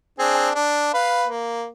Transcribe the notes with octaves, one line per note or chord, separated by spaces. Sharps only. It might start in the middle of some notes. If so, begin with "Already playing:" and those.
C4 D4 G#4
D4
B4 F5
A#3